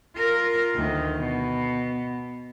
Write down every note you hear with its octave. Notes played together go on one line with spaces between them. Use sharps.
F4 A#4
D2 D#3
B2